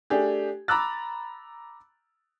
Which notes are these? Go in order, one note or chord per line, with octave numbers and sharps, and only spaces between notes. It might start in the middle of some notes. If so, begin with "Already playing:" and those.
A3 D4 G4 G#4
A#5 B5 D6 E6 F#6 A6